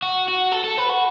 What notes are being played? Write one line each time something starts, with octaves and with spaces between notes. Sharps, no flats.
F#4
F#4
A4
A4
B4
F#4